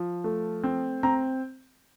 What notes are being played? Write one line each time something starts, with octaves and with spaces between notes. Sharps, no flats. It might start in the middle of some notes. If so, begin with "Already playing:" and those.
Already playing: F3
A3
C4
C4 A#5